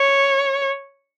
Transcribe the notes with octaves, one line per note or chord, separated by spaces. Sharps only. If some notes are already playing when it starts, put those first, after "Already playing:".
Already playing: C#5